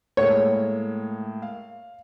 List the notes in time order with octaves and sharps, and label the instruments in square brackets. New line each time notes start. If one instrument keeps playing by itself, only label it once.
[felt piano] A2 G#3 A#3 [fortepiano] C#5
[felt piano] F5